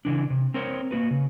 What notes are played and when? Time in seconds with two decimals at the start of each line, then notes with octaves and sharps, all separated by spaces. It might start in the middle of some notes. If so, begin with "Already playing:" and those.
0.05 C#3 E3 D4
0.30 C3
0.54 C4 A#4 C5 C#5
0.91 A#3 F#4 B4
1.11 C#3